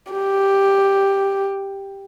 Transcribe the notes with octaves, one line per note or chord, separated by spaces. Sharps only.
G4